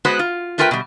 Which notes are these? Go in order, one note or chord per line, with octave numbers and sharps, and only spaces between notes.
G#3 B3 F#4 B4 C5
F4
A3 D4 F4 A#4 B4 G5
B2 G3